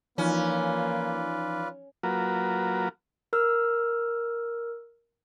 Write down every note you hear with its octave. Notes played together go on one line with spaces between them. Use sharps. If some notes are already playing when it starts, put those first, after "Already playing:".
E3 F3 A#3 C#4 D#4 F4 B4 D5
F#3 A#3 F4 F#4 A#4 B4
A#4 E6 F6